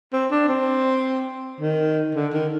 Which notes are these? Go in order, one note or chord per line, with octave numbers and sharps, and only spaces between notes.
C4
D4
C4
D#3
D3
D#3